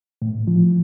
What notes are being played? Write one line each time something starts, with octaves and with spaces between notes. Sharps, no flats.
A2
F3